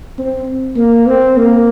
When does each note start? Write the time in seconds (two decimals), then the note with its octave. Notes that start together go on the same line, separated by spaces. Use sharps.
0.18 C4
0.77 A#3
1.07 C4
1.37 A#3